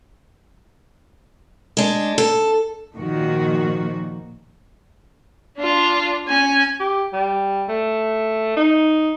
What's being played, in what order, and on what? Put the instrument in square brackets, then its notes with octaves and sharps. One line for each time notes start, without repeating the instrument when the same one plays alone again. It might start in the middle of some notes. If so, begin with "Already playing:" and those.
[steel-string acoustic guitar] G#3 D4
A4
[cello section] A#2 D#3 F3 F#4
[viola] D4 F4
C#4 G#5
[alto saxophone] G4
G3
A3
D#4